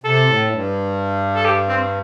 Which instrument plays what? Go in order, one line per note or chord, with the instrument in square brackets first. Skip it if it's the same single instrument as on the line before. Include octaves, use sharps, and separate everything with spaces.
[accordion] C3 [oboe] A4
[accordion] A2
G2
[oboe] A4
G4
C4